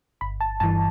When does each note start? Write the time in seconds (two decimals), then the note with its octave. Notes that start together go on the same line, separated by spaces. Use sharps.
0.21 G1 B5
0.41 A5
0.60 G2 E3 A5